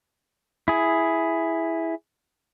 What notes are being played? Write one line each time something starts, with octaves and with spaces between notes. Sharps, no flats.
E4 G#4